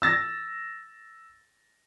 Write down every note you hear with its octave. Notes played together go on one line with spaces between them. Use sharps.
E6 A6 A#6